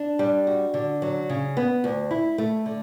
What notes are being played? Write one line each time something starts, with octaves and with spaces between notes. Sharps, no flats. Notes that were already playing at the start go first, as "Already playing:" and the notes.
Already playing: D4
G3
F#4
D3
F#3
C#3
B3
D2
E4
A3
D3